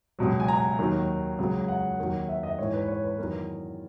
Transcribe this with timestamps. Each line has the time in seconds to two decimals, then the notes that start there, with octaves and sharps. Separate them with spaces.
0.19 C#2 B2 F#3
0.40 G#5
0.48 A#5
0.78 D#2 D#3 F#3
1.38 C#2 C#3 F#3
1.68 F#5
1.99 D#2 D#3 F#3
2.29 E5
2.43 D#5
2.59 G#2 E3 C#5
2.73 B4
2.88 C#5
3.04 B4
3.18 E2 D#3 F#3 A#4